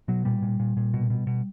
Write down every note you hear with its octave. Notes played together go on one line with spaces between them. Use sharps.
B2 F#3
A#2 G3
A#2
A#2
A#2
B2
B2
B2